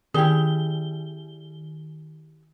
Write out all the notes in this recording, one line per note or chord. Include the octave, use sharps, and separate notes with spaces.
D#3 E4 G4 G#4 G7